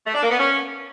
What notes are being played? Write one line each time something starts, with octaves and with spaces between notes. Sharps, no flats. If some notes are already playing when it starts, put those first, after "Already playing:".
A3
D4
A#3
B3
C#4